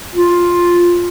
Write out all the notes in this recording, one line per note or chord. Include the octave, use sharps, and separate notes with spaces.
F4